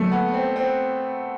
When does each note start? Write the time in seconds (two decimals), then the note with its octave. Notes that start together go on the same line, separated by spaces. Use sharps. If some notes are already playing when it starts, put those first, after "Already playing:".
Already playing: D3 F#3 A3 A#3
0.11 B3
0.33 C4
0.56 C4